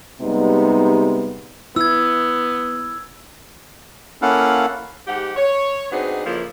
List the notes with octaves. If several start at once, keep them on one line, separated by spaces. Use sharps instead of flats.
C3 G3 G#3 B3 D#4
B3 E4 E6 G#6
A#3 C#4 E4 A4 F5 F#5
G#2 G4 F#5
C#5
B3 C4 D4 D#4 F#4 G#4
F2 C#3 F3 A#3 E4